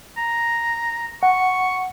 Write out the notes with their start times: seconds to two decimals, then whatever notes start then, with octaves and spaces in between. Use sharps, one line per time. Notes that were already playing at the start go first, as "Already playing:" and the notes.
0.18 A#5
1.23 F#5 C#6